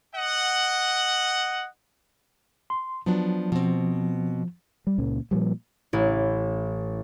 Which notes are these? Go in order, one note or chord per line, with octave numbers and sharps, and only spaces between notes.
D#5 F#5
C6
F3 F#3 B3 D4
B2 F3 C4
G3
C#2 A#2 C#4
A#2 F3 G3
A1 E4